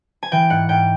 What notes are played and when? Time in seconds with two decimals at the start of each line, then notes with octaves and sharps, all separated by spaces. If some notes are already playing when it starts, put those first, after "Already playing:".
0.23 G#5
0.32 E3 G5
0.50 G#2 F#5
0.69 G#2 G5